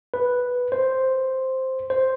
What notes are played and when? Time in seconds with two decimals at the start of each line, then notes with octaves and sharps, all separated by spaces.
0.14 B4
0.72 C5
1.90 C5